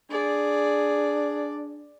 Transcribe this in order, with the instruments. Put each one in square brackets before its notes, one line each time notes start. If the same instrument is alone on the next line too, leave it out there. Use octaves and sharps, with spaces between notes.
[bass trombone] D4 [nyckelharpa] G#4 [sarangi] D5